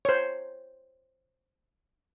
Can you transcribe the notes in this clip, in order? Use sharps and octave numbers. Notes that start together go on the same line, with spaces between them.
C5 C#5